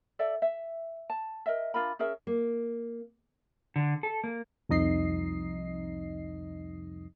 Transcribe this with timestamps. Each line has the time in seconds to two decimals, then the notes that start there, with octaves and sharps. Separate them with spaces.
0.19 A4 D5 E5
0.42 E5
1.10 A5
1.46 A#4 D#5 E5
1.74 D4 F4 A#4 B5
1.99 C#4 G#4 A#4 E5
2.27 A#3
3.76 D3
4.03 A4
4.24 A#3
4.69 C2 F2 D#4 D#5 C7